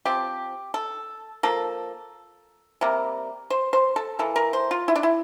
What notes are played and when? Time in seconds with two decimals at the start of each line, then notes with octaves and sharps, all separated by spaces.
0.05 F3 C4 G4
0.74 A4
1.43 F3 A#3 A4
2.81 C3 G3 A#3
3.50 C5
3.73 C5
3.96 A4
4.19 E3 A#3 A4
4.36 A#4
4.53 C5
4.71 F4
4.88 E4
4.95 D4
5.03 E4